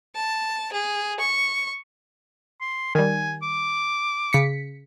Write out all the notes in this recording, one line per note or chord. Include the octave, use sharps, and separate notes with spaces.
A5
G#4
C#6
C6
D#3 G3 G#5
D6
C#3 B6 C#7